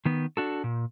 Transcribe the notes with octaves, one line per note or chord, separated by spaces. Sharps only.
D#3 B3
D4 F#4 A4
A#2